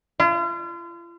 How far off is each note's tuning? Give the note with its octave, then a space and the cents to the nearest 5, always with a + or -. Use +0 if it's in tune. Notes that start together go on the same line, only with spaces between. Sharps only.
F4 -40